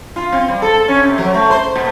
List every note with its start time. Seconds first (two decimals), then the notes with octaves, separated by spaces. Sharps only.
0.16 F4
0.32 C4
0.49 G3
0.62 A4
0.88 C#4
1.03 C3
1.18 F#3
1.34 A3
1.50 C5
1.76 A#2